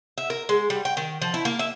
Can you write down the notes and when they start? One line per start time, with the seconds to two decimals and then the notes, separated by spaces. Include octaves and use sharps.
0.18 E5
0.30 A#4
0.49 G#3
0.70 G3
0.85 G5
0.97 D#3
1.22 F3
1.34 E4
1.45 A#3
1.59 E5